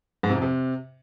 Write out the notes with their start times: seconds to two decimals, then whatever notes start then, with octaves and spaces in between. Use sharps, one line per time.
0.23 G#2
0.30 C3
0.36 F2
0.42 C3